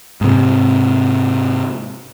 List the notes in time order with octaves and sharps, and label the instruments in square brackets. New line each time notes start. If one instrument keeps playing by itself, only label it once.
[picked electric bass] G#2 C3